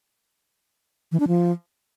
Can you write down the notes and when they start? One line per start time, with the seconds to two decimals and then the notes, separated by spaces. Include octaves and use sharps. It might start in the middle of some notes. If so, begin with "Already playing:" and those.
1.12 E3
1.20 D4
1.28 F3